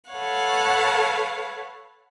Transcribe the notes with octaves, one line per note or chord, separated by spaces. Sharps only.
A4 B4 C#5 F5 F#5